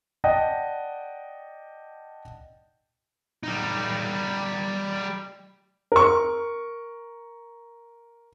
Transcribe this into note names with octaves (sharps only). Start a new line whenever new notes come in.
D5 D#5 F#5 G5 A5
G3 D#4
A#4 C#6